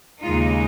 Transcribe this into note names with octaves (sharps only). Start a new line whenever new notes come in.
D#2 C#3 G#3 D#4 F4